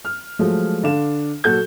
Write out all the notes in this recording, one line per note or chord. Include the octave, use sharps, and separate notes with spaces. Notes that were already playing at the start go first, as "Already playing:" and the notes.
F6
F3 F#3 G#3 A3
D3 D4 F5 E7
A#2 F#3 F#4 A4 G6